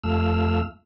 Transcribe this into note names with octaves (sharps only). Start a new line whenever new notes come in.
F2 A3 F5 E6